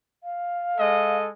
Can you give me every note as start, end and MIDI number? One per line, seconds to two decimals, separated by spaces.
0.24 1.17 77
0.77 1.29 56
0.77 1.29 69
0.77 1.29 75